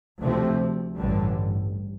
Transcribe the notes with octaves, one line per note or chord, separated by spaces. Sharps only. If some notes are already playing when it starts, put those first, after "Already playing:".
D2 C3 F3 A3 C4
A1 G2 D3 G3